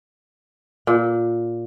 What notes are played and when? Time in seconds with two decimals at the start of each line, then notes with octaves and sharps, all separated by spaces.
0.87 A#2